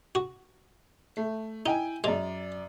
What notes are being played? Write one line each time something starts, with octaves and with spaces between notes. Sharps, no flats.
F#4
A3
D#4 E4 G5 G#5
F#2 G#3 D5 F7